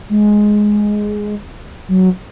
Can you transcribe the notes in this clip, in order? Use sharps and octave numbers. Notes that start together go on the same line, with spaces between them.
G#3
F#3